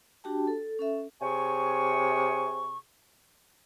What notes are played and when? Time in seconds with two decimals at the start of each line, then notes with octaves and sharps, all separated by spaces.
0.24 D4 F#4 G4 G5 A5
0.47 A4
0.79 C#4 A4 E5
1.22 C3 G#4 C#5 G#5 C#6